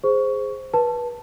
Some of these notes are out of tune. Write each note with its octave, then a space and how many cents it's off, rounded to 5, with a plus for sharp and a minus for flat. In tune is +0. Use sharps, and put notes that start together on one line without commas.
G#4 +0 C5 +0 C#6 +15
B4 -25 A5 +0